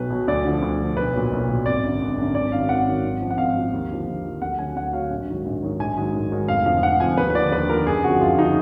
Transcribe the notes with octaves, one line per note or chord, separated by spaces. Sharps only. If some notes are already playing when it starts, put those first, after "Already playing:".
Already playing: B1 B2 F#3 B4
B2 F#3
D2 D5
D3 F3
D2
D3 F3
B1 B4
A#2 F#3
B1
A#2 F#3
G#1 D5
F#2 D3
G#1
F#2 D3
G#1 D5
F#2 D#3 F#3 F5
G#1 F#5
F#2 D#3 F#3
G#1
F#2 F3
F#5
G#1 F5
F#2 F3
D#2
D3 F3
D#2
D3 F3
D2 F#5
D3 F#3 G#5
D2 F#5
D3 F#3 F5
A#1
G#2 D#3 F#3
A#1
G#2 D#3 F#3
A#1 G#5
G#2 D#3 F#3
A#1
G#2 D#3 F#3
F1 F5
F2 D3 F3 F5
F1 F#5
F2 D3 F3 G#5
D#2 B4
B4
D3 F3 D5
D#2 B4
D3 F3 A#4
F#1 G#4
F2 D3 F3 F#4
F#1 F4
D3 F3 D#4